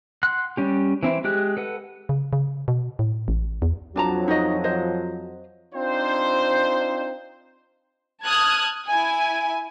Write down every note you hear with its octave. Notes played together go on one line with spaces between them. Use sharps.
F#5 C6 F#6
G3 C#4 G4
E3 C4 E4
G#3 G4 F#6
A4 B4 F#5
C#3
C#3
B2
A2
A1
E2
F2 F3 F#3 D4 A5 A#5
D#4 F#4 D#5
C5 D#5
C4 D4 D#4 F4 C5
A5 D#6 F6 F#6 G#6
E4 G#5